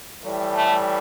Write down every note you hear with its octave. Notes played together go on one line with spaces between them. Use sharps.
A2 E3 G3
A3